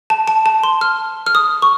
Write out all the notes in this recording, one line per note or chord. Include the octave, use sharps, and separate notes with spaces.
A5
A5
A5
C6
F6
F6
D#6
C#6